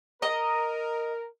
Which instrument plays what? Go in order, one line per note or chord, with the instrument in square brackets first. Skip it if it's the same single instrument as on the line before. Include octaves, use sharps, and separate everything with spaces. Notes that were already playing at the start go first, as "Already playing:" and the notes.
[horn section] A#4 [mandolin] D#5 A#5